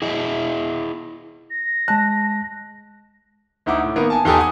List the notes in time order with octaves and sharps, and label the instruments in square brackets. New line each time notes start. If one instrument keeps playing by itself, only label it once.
[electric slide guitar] E4 G#4 D#5 E5
[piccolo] A#6
[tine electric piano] G#3 F#6 [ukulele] A5
[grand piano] D2 D#4 E4 F#5 D6
A2
D#3 A#3 B3
G#5 A5
E2 D#4 G4 A4 B4 G#5
F#5 G#5 D#6